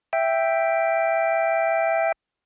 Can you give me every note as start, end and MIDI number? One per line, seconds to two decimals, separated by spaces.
0.13 2.12 76
0.13 2.12 79